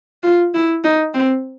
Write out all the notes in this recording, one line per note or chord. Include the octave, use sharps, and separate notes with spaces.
F4
E4
D#4
C4